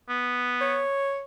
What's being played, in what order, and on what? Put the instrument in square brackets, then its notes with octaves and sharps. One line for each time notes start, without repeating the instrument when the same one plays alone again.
[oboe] B3
[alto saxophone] C#5